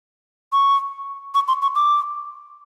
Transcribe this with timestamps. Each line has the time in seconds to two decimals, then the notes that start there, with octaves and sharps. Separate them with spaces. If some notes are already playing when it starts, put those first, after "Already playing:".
0.53 C#6
1.35 C#6
1.48 C6
1.62 C#6
1.75 D6